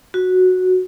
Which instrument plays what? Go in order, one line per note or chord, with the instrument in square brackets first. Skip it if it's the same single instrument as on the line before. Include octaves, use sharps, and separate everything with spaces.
[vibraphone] F#4